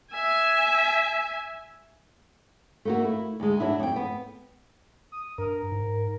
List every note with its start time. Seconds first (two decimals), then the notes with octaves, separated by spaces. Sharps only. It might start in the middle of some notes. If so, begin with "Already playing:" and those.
0.13 E5 G#5
2.85 A3 A#3 F#4
3.05 E4
3.40 D2 G#3
3.60 F#3 D4 E4
3.79 F2 G5
3.96 B3
5.12 D#6
5.38 G2 A#4
5.72 G#2